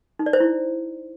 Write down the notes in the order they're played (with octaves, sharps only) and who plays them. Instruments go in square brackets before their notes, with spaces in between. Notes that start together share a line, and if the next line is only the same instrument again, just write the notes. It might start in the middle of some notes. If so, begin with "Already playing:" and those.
[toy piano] D#4
D5
C5
E4